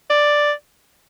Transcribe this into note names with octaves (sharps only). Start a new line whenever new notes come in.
D5